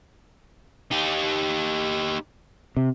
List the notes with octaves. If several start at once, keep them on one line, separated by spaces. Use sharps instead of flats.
D#4 G4
C3